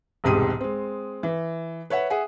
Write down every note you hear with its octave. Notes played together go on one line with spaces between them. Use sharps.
E1 C2 G#2 G4 D#6 D#7
G#3 C4
E3
B4 C#5 E5 F#5
G#4 E5 F#5 G#5